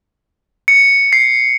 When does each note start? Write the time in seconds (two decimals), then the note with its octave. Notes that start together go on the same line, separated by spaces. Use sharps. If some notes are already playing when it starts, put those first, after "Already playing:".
0.68 C#7
1.13 C7